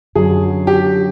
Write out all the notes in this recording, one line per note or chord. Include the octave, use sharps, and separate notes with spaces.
F#2 D3 F#3 G#4
G4